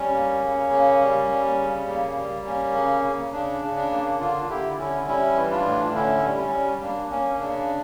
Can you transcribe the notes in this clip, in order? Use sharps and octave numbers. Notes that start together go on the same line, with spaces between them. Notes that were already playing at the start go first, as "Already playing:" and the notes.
Already playing: G3 C#4
A#3
C#3
A#3
G3
G3
C#3
A#3
G3
A#3 C#4
C#3
C#3
C#3 D4
C#3
D4
A#3
D3 D4 F4
D3 E4 G4
D3 C#4 E4
G3 C#4 E4
E3
D4 F4
A2
D4
D3 C#4 E4
G3
C#4
G3
A#3 D4
A#3 C#4
C#3 D4